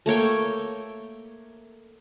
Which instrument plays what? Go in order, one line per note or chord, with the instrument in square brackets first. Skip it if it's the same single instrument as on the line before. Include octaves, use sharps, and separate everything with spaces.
[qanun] A3 A#3 C#5 G5